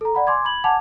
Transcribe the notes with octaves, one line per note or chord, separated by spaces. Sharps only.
A4 A#5
D5 F#5 B5
G#5 C6 D6 G#6
B5 G#6 F#7
F#5 G#5 A5 D6 G#6 F7